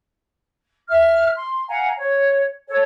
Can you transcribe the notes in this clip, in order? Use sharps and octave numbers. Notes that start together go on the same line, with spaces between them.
E5 F6
C6
F5 F#5 G#5 A#5
C#5
A4 C#5